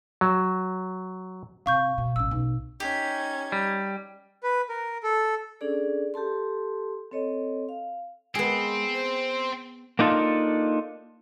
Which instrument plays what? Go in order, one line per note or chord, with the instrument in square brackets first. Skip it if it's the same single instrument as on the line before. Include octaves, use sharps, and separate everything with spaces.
[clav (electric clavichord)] F#3
[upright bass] C3 [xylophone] F5 C#6 G6
[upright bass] B2
[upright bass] A1 C#3 [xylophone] E6
[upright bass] B1
[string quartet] C#4 D#4 G#6 [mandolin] G4
[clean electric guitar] G3
[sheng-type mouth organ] B4
A#4
A4
[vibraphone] C#4 D4 G#4 A4 D5
G4 A4 A5 C6
C4 A4 C#5 D#5
F5
[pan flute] G#3 [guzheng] B3 G#4 [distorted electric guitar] C4
[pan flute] C5
[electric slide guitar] A#3 D4 D#4 F4 A4